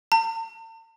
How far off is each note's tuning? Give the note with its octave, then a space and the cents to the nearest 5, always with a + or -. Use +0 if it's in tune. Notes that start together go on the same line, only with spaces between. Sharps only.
A5 +45